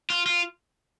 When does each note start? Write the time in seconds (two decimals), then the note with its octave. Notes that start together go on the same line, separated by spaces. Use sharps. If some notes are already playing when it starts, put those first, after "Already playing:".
0.10 F4
0.26 F4